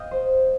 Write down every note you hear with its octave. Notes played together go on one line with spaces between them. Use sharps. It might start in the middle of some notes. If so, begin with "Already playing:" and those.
Already playing: D#5 F5 G5
C5